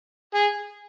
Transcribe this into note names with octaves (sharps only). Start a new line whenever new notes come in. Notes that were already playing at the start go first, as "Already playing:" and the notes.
G#4